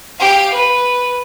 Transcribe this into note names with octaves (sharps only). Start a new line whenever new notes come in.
G4 F5
B4